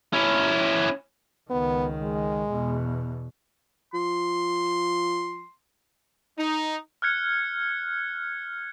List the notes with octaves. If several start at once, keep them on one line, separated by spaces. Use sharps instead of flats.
C#4 E4
C#2 D#3 B3
G#3
E2 B2
F3 C6
D#4
F6 F#6 G#6 C#7